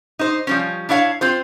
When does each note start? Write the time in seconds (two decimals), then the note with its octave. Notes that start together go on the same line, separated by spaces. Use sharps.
0.19 D#4 C5
0.47 F3 G3 C#4
0.89 D4 E4 C#5 F5
1.21 C4 F4 C5